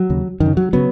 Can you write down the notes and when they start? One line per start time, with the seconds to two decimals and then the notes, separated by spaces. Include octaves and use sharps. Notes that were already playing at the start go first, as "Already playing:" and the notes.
Already playing: F#3
0.10 D#2 C#3
0.40 F#2 D#3
0.46 C#3
0.57 F#3
0.73 C#3 F#3 B3